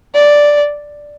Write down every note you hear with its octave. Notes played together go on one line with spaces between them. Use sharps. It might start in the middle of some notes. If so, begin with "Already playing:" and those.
D5